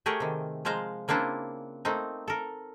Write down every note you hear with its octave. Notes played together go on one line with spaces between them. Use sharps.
A3 G4 G#4 A#4 C#5 F#5
C3 D#3
F3 G#3 C5 F5 A#5
C#3 A#3 C4 D4 E4 F4
A3 A#3 C4 D#4
A4 A#4